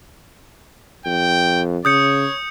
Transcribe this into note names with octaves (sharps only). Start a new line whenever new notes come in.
F2 G5
C#3 C#5 D#6 G6 C#7